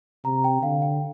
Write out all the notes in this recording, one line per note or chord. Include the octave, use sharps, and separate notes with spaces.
C3 A#5
G5
D3 F5
G5